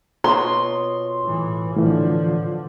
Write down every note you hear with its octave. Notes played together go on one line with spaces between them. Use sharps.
B2 F4 C#5 C6
A2 E3
A2 D3 E3 F3